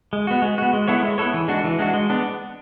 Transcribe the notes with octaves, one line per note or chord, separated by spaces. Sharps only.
G#3
B3 F#4
G#3
B3 F#4
G#3
B3 E4 A4 C#5
G#3
B3 E4 A4 C#5
E3
G#3 D4 F#4
E3
G#3 D4 F#4
G#3
B3 D4